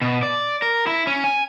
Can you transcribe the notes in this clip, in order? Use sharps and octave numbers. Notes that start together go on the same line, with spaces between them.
B2
D5
A#4
E4
C#4
G#5